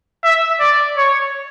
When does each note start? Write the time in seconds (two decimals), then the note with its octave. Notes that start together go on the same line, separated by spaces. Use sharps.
0.24 E5
0.60 D5
0.97 C#5